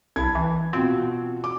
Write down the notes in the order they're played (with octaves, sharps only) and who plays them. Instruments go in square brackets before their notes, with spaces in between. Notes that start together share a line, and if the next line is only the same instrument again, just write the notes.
[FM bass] C2 [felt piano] A5 B5 G#6
[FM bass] E3
[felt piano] B2 F4 F#4 [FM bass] C4
[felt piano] D6